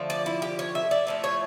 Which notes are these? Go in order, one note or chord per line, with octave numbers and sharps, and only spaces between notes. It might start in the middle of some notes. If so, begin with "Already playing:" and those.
Already playing: D3 F3 A3
D5
E4
G4
C#5
E5
D5
A2 F3 A3
C#5